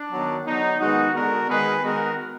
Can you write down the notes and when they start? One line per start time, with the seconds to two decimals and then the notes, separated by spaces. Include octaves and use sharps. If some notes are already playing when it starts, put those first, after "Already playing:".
Already playing: D4
0.10 D#3 F#3 B3
0.45 D3 F#3 B3 D#4
0.80 D#3 G#3 B3 D#4 F#4
1.14 D3 G#3 B3 F#4 A#4
1.49 D#3 G#3 B3 G#4 B4
1.83 D#3 G#3 B3 F#4 A#4